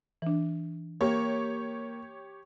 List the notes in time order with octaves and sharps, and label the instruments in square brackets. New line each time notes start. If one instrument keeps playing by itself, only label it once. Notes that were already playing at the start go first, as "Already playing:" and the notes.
[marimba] E3 D4
[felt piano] A#3 [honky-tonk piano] G4 C#5